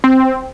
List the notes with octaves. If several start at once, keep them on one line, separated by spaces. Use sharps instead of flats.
C4